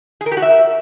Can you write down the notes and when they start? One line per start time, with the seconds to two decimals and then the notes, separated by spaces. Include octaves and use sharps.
0.21 G#4
0.26 A#4
0.31 G4
0.37 F#4
0.42 E5